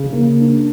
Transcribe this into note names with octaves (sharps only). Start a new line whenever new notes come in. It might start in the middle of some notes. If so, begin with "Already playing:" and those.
Already playing: C#3
A#3
D4